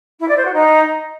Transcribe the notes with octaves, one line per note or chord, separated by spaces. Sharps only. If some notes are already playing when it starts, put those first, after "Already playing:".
E4
D5
C5
F#4
D#4